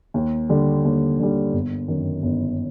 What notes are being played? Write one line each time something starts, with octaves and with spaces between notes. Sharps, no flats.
D#2
D3 G3
D#2
D3 G3
G1
F#2 D#3
G1